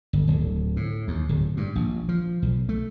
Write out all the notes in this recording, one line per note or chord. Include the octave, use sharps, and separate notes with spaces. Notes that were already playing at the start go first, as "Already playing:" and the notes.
G1
D1
A2
D#2
D1
G2
A#1
F3
B1
A3